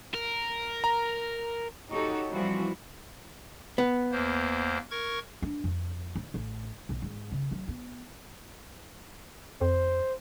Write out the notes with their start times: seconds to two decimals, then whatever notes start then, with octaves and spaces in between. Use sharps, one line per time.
0.14 A#4
0.84 A#5
1.92 D#4 F#4 G4 A4 C#5
2.31 E3 F3 G3 C4 E4 F#4
3.78 B3
4.12 E2 A#3 C5
4.91 A#4 C#6 G#6
5.42 D4
5.64 F2
6.15 D#3
6.34 A1
6.89 B1
7.02 G#2
7.32 C#3
7.51 F#3
7.68 B3
9.61 F2 C5